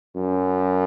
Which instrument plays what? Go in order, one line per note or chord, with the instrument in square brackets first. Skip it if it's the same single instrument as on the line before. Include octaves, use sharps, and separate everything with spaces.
[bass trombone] F#2